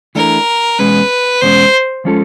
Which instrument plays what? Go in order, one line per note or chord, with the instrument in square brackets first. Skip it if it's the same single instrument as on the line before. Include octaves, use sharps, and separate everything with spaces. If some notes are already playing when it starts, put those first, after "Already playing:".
[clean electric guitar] E3 A3 D4 [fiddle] A#4
[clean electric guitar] E2 B2 G#3 C#4 [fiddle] B4
[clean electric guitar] E2 B2 G#3 C#4 [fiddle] C5
[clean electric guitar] F3 G#3 C#4 F4 A4